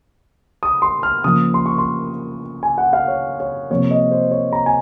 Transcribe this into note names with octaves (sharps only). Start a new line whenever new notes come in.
D#6
C6
F6
C#3 F3 A#3 D#6
C6
C#6
C6
G#5
F#5
F5
C#5
C#5
C3 F3 A#3 C#5
D#5
C5
C#5
A#5
G#5